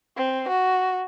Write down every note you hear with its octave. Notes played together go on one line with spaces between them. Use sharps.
C4
F#4